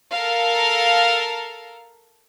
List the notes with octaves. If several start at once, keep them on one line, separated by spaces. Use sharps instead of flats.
A4 A#4 F5